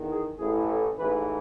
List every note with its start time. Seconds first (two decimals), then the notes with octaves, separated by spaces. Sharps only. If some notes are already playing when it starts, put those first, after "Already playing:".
Already playing: E2 D#3
0.09 G#4
0.38 A1 A2 E3 G#4
0.68 A4
0.97 A1 G#2 E3 B4